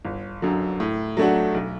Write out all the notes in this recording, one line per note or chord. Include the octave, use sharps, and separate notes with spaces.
G1
F#2 D3 F#3
A2
F#3 A3 D4 F#4
B1